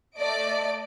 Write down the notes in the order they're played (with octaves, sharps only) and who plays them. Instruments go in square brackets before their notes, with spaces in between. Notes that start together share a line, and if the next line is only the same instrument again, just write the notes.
[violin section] A3 D5 D#5 D7